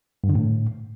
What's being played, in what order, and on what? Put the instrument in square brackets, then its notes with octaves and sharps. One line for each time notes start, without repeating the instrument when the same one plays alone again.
[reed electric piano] G2
D3
A2